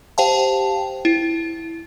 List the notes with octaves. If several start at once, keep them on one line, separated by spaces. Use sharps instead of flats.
G4 C5 F5 G5 A5
E4